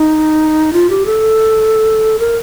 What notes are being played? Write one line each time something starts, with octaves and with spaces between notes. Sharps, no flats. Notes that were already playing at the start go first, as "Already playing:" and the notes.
Already playing: D#4
F4
G4
A4
A#4